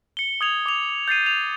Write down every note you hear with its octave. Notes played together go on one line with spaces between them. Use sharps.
C#7 G7
D#6 G#6 F7
D6 F7
G6 A6 C7 D#7
F7